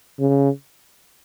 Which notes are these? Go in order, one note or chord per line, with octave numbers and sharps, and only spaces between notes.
C#3